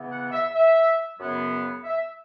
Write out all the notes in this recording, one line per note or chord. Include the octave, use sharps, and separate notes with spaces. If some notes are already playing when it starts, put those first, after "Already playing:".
Already playing: C#3 E3 B3
F#5
E5
E5
F#2 C#3 F#3 B3
E5